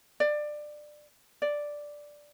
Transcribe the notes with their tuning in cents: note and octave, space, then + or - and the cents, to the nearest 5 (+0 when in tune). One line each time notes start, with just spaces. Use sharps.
D5 +20
D5 +0